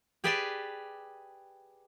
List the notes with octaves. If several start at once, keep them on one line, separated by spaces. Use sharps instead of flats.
G4 G#4 B4 D5 G5 A5